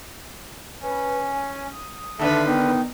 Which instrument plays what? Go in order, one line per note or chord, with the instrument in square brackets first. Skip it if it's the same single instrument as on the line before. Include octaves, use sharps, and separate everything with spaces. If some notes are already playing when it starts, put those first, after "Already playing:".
[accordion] C#4 [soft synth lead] B4
[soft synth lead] G#5
D#6
[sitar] D#2 D3 B4 [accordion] A4 E5
[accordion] D#3 D#4 [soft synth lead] B3